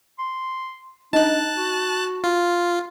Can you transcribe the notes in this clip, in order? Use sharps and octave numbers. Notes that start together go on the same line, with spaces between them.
C6
D4 D#4 A5 F#6
F#4
F4